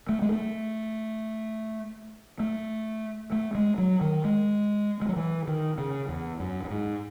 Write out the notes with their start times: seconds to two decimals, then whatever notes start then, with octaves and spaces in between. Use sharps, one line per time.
0.09 A3
0.22 G#3
0.32 A3
2.40 A3
3.32 A3
3.55 G#3
3.78 F#3
4.01 D#3
4.25 G#3
5.02 G#3
5.09 F#3
5.16 E3
5.47 D#3
5.78 C#3
6.09 E2
6.40 F#2
6.64 F#2
6.71 G#2